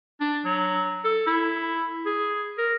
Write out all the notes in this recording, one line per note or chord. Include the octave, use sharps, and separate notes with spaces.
D4
F#3
A4
E4
G#4
A#4